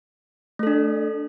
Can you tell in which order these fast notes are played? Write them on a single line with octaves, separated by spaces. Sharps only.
A3 A4 D4